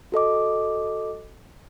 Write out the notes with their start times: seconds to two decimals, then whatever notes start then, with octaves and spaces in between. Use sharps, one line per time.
0.12 F#4 A4 D#5 D6